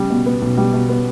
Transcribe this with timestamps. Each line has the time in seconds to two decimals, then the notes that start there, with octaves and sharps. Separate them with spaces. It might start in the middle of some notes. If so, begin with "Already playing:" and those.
Already playing: C#3 G3
0.09 B2
0.26 B3
0.42 B1
0.57 G3
0.73 B2
0.89 B3